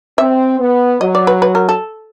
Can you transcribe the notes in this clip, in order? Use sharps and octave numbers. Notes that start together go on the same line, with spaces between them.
C4 E5
B3
F#3 D#5
D5
B4
B4
A#4
A4